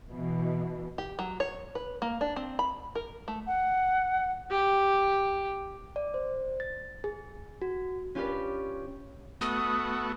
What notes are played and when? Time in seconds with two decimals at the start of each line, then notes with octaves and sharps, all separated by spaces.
0.10 B2 E3
0.98 G4
1.19 F#3
1.40 C#5
1.75 B4
2.02 A#3
2.21 D4
2.36 C4
2.59 B5
2.95 A#4
3.28 A3
3.47 F#5
4.51 G4
5.96 D5
6.14 C5
6.60 A6
7.04 G#4
7.62 F#4
8.15 C#4 F4 G4 B4 D5
9.41 A3 B3 F#4 D#6